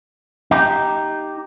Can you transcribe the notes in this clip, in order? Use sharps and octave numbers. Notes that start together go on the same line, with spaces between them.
D#4 G4